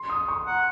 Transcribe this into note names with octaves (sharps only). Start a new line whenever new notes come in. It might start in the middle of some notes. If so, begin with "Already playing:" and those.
Already playing: C6
D#6
C#6
F#5 A#5